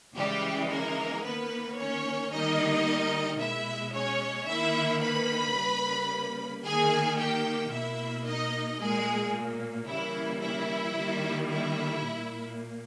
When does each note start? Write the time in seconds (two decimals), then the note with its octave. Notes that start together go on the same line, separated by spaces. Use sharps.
0.16 C#3 E3 G3 G#3 G4
0.70 A#3 A#4
1.24 D#3 A#3 B3 B4
1.78 C#4 C#5
2.32 D#3 G3 A#3 D#4 D#5
3.40 B2 G#3 E4 E5
3.94 C#4 C#5
4.48 D#3 A#3 E4 E5
5.02 B4 B5
5.55 C#3 G3 A#3
6.64 D#3 A#3 G#4 G#5
7.18 G4 G5
7.72 B2 A#3 E4 E5
8.26 D#4 D#5
8.79 A#2 G#3 A#3 G#4
9.88 C#3 E3 G3 A#3 E4
10.41 E4
10.96 D#3 G3 A#3
11.49 E4
12.04 A#2 A#3